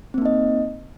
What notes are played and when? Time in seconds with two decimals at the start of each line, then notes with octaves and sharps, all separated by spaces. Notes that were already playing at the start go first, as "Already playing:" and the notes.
0.14 C4
0.18 A#3
0.22 D#4
0.26 D#5